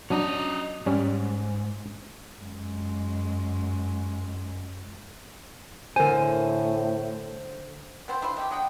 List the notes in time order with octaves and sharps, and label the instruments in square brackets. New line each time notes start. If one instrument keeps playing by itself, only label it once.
[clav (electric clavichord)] F#3 D4 [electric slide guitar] C#4 D#5 A#5
[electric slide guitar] G#2 [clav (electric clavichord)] G3 C#4
[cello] F#2 G#3
[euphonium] A2 [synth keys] D3 C5 [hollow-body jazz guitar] A#4 G#5
[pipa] B3 C4 C5
D4 E4 F4 C5
D#3 C4 G4
F#3 D#5 F#5 G5